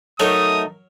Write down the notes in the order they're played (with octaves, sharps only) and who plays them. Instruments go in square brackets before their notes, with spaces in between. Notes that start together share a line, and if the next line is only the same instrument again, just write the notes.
[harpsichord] F#3 A#4 C#5 [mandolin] A3 D#4 D#5 [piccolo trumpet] D#6